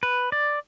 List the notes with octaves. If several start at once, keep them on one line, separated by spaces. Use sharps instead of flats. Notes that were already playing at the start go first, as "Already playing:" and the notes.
B4
D5